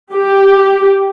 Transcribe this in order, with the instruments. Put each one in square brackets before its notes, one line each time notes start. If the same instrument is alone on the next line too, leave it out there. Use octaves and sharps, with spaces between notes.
[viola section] G4